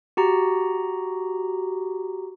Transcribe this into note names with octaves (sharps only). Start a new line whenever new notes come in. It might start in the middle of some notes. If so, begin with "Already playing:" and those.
F#4 G4 A#5